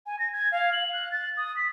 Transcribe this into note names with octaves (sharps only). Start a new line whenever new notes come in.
G#5
A#6
G#6
F5
F#7
F#6
A6
D#6
B6